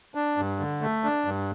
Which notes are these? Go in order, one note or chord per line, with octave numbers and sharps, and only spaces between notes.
D4
G2
D3
A3
D4
G2